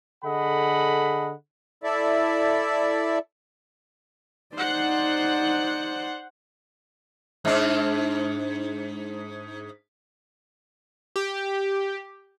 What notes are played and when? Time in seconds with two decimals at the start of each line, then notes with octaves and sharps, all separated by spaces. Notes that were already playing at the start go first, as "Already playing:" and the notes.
0.25 D3 G#4 A4 D#5 F#5 B5
1.83 E4 A4 D5 E5
4.56 D#4 C5 D5 F#5
7.45 G#2 D4
11.16 G4